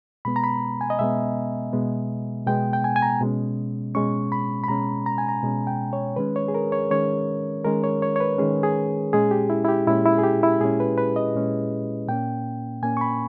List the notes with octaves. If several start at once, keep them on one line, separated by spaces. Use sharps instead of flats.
B2 G#3 B3 B5
A#5
B5
G#5
D#5
B2 G#3 B3 E5
B2 G#3 B3
B2 G#3 B3 G5
G5
G#5
G#5
A#5
B2 G#3 C#4
B2 G#3 C#4 C#6
B5
B5
B2 G#3 C#4 A#5
A#5
G#5
A#5
B2 G#3 C#4
G5
C#5
D#3 G#3 C#4 B4
C#5
G#4
A#4
C#5
D#3 G#3 C#4 C#5
D#3 G#3 C#4 A#4
C#5
C#5
C#5
B4
D#3 G#3 C#4 G#4
G#4
A#2 G#3 C#4 G#4
G4
E4
E4
G4
A#2 G#3 C#4 E4
E4
G#4
G4
E4
A#2 G#3 C#4 G#4
B4
B4
D#5
A#2 G#3 C#4
A#2 A#3 C#4 G5
A#2 A#3 C#4 G#5
C#6
B5